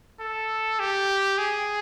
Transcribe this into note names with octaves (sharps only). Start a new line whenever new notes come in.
A4
G4
G#4